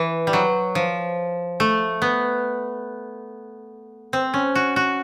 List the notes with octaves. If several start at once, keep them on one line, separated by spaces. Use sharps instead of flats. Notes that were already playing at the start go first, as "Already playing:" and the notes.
Already playing: E3
G3
F#3
F3
A3
B3
C4
C#4
F#4
F#4